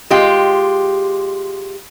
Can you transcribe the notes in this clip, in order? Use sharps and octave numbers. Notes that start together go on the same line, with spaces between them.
G#3 F4 G4